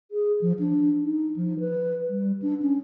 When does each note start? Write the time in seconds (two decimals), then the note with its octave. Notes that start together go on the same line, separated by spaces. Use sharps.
0.11 G#4
0.41 F3
0.59 D4
1.03 D#4
1.36 F3
1.60 B4
2.09 G3
2.42 D4
2.62 C#4